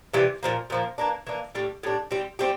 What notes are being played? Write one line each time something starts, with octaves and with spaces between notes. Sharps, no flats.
C3 E3 G3
A#2 F3 A#3
A#2 F3 A#3
E3 A#3 D4
E3 A#3 D4
A2 G3 D4
A2 G3 D4
G3 C4 G4
G3 C4 G4